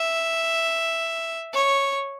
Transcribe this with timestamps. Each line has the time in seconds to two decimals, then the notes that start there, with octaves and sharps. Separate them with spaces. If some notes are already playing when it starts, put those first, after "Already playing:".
Already playing: E5
1.54 C#5